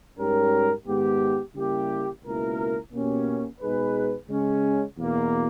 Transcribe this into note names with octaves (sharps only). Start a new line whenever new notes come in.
G#2 G3 C#4 G4 A#4
G#2 D#3 G#3 B3 G4
C#3 G3 A#3 E4 G4
C#2 B2 A#3 E4 A#4
B2 A#3 C#4 G4
B2 G#3 D#4 G#4 B4
C#3 G#3 C#4
E2 B2 A#3